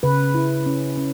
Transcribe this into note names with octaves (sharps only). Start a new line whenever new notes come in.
C#3 B4
E4
C#4
C#4